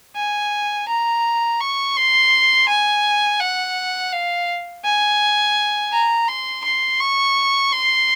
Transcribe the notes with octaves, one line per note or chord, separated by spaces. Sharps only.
G#5
A#5
C#6
C6
G#5
F#5
F5
G#5
A#5
C6
C6
C#6
C6